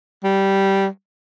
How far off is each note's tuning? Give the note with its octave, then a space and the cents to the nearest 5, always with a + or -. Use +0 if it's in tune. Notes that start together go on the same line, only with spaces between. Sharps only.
G3 -10